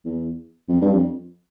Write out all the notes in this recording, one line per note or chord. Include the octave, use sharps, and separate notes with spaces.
E2
F2
G2
F2